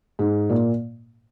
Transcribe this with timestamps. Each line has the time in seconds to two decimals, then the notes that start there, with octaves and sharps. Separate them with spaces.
0.19 G#2
0.49 A#2